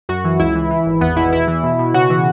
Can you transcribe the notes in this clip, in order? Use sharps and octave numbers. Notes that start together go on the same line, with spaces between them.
F#2 F#4
E3
C#2 E4
E3
E3
G#1
E2 B3
B2 E4
E2 E4
E3
B2
B2
C#3 F#4
E3